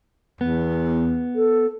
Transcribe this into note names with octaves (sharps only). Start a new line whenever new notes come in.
E2 B3
A4